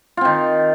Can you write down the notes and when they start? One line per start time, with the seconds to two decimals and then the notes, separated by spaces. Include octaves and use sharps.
0.17 F4
0.21 C4
0.25 D#3